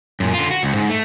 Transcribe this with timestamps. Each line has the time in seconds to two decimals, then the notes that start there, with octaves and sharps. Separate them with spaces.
0.20 F#2 A#2
0.34 D3 F4
0.51 F#4
0.63 C#2
0.75 G#2
0.89 A3